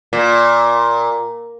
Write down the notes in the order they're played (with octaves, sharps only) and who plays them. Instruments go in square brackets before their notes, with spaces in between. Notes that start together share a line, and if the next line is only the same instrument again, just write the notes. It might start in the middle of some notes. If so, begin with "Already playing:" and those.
[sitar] A#2